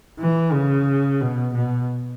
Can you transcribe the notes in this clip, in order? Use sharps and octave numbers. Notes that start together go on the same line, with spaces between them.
E3
C#3
B2
B2